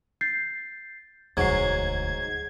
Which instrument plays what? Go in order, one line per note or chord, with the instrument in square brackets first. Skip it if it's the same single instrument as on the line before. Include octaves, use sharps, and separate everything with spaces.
[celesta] G6 A6 C7
[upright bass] E1 D2 [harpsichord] G#2 F#3 [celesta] G#4 C7 [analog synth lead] G#6